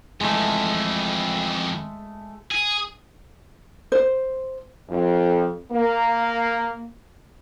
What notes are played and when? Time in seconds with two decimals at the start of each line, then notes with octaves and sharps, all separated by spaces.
0.21 F2 E3 G#3 A3
2.51 G#4
3.92 C5
4.89 F2
5.72 A#3